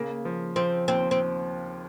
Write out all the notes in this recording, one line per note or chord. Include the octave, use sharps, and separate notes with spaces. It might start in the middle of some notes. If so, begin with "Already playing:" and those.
Already playing: C#3 A#3
F3
F3 C4
D#2 C4
C4